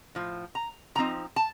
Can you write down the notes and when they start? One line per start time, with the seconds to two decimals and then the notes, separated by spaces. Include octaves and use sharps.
0.15 A2 F3
0.55 A#5
0.95 A2 F3 C4 D#4 A#5
1.36 A5